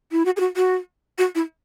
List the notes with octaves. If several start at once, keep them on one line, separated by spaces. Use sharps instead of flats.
E4
F#4
G#4
F#4
F#4
F#4
E4